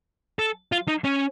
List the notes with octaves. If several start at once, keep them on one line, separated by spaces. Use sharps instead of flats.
A4
F4
D#4
C#4